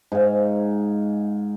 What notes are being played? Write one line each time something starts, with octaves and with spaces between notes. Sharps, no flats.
G#2 F5